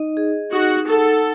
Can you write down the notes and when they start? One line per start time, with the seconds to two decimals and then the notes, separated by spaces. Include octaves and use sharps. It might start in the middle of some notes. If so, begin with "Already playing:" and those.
Already playing: D#4 D#5
0.17 G#4
0.53 D#4 F#4
0.88 A4 F#5